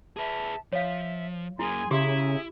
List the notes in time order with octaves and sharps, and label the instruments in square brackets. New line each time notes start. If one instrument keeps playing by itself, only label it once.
[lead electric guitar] G#4 B4 [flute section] E5 A5
[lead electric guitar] F3 [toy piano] C#5 F5 [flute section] E5
[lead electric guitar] F#2 A#3 [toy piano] E4 [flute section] G#4 G#5 C6
[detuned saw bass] C#3 [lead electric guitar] E4 [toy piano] G4 C6 D6 [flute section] G#4 E5 A#5